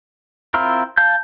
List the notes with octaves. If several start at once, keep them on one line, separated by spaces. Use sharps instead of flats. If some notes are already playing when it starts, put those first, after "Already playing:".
C4 E4 F4 A#4
F5 A5 G6